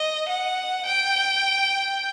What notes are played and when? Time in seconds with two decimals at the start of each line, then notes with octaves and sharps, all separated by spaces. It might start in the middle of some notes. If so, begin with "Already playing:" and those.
Already playing: D#5
0.28 F#5
0.86 G5